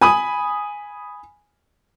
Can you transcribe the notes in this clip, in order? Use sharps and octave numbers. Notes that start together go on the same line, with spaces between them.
G#5 B5 D#6